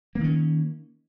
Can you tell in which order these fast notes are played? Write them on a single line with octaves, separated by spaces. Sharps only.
A#3 D#3 C#4